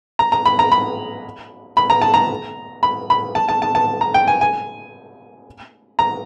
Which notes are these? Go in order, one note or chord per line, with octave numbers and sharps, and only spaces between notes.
A#5
A#5
B5
A#5
B5
B5
A#5
A5
A#5
B5
B5
A5
A5
A5
A5
A#5
G5
G#5
G#5
A#5